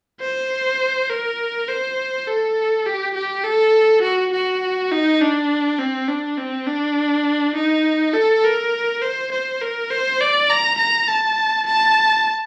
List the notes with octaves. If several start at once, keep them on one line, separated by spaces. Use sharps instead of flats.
C5
A#4
C5
A4
G4
G4
A4
F#4
F#4
D#4
D4
C4
D4
C4
D4
D#4
A4
A#4
C5
C5
A#4
C5
D5
A#5
A#5
A5
A5